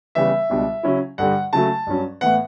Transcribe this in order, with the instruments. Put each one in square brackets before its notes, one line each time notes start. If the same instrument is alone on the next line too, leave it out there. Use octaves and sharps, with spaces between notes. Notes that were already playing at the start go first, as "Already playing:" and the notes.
[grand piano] C#3 E3 G3 B3 E5
C#2 B2 G3 D4
C#3 F#3 C#4 E4
G2 D3 G3 F#5
C#3 F#3 A3 A5
G2 F#3 C#4
A2 E3 B3 F#5